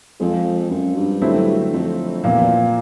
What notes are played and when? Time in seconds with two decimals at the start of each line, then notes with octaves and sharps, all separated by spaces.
0.20 F2 F3 G#3 C4 F4
0.70 F#2
0.96 G2
1.22 D3 F#3 A3 C4 E4
1.73 F2
2.24 E2 A#2 F3 A#3
2.41 E2